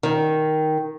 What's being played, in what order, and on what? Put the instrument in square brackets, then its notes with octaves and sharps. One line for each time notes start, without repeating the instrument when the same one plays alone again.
[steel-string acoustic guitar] D#3